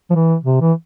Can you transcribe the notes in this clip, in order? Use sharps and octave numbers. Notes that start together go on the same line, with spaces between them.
F3
E3
C3
E3